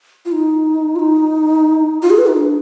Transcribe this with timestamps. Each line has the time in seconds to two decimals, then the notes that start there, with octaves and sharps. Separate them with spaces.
0.25 F4
0.32 D#4
0.96 F4
0.99 D#4
2.02 F4
2.10 G#4
2.18 B4
2.27 D#4
2.35 D4